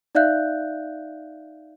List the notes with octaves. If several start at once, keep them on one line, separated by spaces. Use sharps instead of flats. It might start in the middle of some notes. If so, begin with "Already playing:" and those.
D#4 D5 E5 F5 F#6 G6